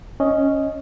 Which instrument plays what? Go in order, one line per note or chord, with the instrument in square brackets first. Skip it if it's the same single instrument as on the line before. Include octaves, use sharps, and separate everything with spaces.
[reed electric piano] C#4 D#5